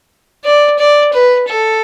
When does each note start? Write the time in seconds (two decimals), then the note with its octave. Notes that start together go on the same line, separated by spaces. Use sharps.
0.45 D5
0.79 D5
1.13 B4
1.47 A4